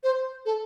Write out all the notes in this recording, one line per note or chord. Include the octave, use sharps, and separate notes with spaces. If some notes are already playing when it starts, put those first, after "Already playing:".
C5
A4